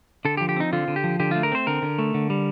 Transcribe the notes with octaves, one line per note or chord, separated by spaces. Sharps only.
D3 A4
G4
F3
G4
C4 D#4
D3 F4
D3
G4
F3
D3 G4
A3 F4
A#4
C4 C5
D3 A#4
D3
A3
D3
G3